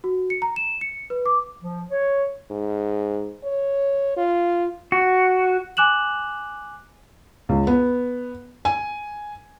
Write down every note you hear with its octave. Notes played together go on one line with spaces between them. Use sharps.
F#4
C#7
A#5
E7
C#7
B4
D6
F3
C#5
G#2
C#5
F4
F#4
G#5 D6 F#6 E7 F#7
C#2
B3
G#5